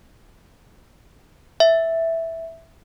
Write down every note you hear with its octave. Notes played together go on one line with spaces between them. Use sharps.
E5